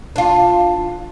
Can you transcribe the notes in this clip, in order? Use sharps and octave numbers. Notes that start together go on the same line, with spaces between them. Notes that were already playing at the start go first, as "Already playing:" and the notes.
D4 F4